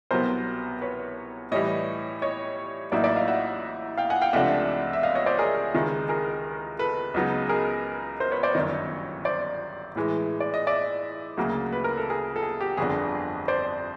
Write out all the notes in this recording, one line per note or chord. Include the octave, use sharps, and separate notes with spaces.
C2 B2 F#3 B3 A#4 C5
B4 C#5
A2 E3 G3 C#5 D#5
C#5 D#5
A1 A2 F#3 A#3 D#4 D5 E5
D5 E5
D#5 F5
E5 F#5
F5 G5
F#5 G#5
F5 G5
C#2 C3 F3 A3 D4 E5 F#5
E5
D#5 F5
C#5 D#5
C5 D5
G#4 A#4
C#2 C3 D#3 G#3
G#4 A#4
A4 B4
C#2 C#3 F#3 B3 D#4
G#4 A#4
A#4 C5
B4 C#5
C5 D5
G1 F#2 D#3 C#5 D#5
C5 D5
A2 E3 G#3
D5
D#5
D5 E5
D2 C#3 F#3 A#3
B4
A#4
A4
G#4 A#4
A4
G#4
G4
G1 F2 D3 G#4
C5 D5